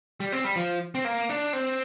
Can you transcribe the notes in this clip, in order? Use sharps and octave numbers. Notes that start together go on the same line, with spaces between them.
G3
C4
G3
F3
C4
A#3
D4
C4